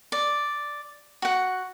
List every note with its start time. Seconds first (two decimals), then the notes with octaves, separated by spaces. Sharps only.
0.12 D5
1.22 F#4 F#5